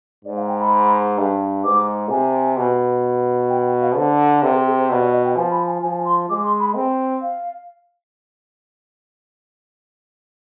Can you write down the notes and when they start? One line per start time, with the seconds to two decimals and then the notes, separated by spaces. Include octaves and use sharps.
0.25 G#2 D5
0.36 F5
0.48 G5
0.60 B5
1.18 G2
1.64 G#2 D6
2.10 C3 G#5
2.57 B2
3.50 G5
3.66 G5
3.81 F5
3.96 D3 C5
4.43 C3 B4
4.54 G#4
4.66 G#4
4.78 C5
4.90 B2 D5
5.01 D5
5.12 D#5
5.25 G5
5.36 F3 G#5
5.51 B5
5.66 G#5
5.82 F3 G#5
6.05 C6
6.29 G#3 D6
6.44 C6
6.60 B5
6.75 C4
7.21 F5